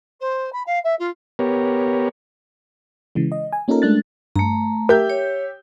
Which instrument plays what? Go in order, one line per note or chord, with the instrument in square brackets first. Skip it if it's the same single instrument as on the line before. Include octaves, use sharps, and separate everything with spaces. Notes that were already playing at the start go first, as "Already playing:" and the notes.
[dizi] C5
B5
F5
E5
F4
[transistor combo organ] B3 G4 A#4 C#5
[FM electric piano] C#3 E3 G#3
D#5
G#5
A#3 C#4 D#4 F4 A4 A#4
G#3 A3 D4 F#6 A6
[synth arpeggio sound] G2 [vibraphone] A3 A#5
[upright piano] G4 E5 G6 [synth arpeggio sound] A#4
[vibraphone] C#5